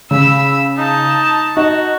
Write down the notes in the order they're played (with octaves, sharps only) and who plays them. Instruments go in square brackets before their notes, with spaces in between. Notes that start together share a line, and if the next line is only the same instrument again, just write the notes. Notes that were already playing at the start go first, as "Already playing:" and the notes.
[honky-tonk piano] C#3 [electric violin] B5 E6
[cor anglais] D#4 [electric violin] A5
[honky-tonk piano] D#4 [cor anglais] F#4